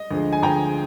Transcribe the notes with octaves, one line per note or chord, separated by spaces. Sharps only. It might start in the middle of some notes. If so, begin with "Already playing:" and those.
Already playing: D#5
D2 D3 F3 G#3
G#5
D2 D3 F3 G#3 G5 A#5